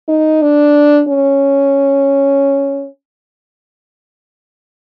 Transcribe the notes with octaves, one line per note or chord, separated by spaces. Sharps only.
D#4
D4
C#4